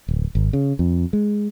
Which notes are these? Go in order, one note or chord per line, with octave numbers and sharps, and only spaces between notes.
D1
G#1
C#3
F2
G#3